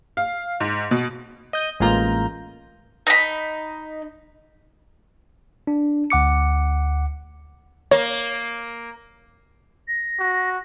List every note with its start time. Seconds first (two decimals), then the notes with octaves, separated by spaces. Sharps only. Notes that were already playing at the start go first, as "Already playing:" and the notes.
0.17 F5
0.60 G#2
0.91 B2
1.53 D#5 G6 D#7
1.80 A1 G#3 A#3 F4 A#5 G6
3.07 D#4 B5
5.67 D4
6.10 D2 F#5 D6 C#7
7.91 A#3 C#5
9.88 A#6
10.19 F#4